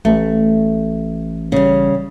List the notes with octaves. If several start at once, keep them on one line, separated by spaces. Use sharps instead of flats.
A1 A3
C#3 G3